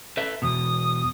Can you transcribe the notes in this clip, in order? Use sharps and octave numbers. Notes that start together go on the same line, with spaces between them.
A4 B4 E5
E2 B2 D#6